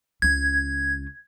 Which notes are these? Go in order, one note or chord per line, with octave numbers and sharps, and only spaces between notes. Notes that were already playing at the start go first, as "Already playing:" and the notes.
C#2 C#4 G#6